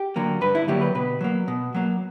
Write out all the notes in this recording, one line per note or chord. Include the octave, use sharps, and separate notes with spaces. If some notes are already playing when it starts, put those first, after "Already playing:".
Already playing: G4
D3 F#3 A#3
G2 B4
E4
D3 F#3 A#3 G4
B4
B2 B4
F#3 A#3
B2
F#3 A#3